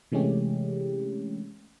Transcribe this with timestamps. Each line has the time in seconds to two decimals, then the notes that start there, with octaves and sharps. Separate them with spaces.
0.12 C3 E3 G#3 A3 C#4 G4